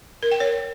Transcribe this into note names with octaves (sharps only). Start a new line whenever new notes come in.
A#4
G5
C#5